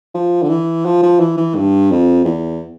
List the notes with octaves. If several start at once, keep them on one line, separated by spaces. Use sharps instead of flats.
F3
D3
E3
F3
F3
E3
E3
G2
F2
E2